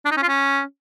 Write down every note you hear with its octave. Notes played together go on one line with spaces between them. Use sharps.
D4
D#4
C#4
F4
C#4